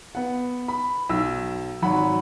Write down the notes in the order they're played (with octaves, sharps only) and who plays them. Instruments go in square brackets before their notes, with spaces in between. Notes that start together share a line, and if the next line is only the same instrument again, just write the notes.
[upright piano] B3 F#5
B5
B1 E6
G#1 F#3 F#5 B5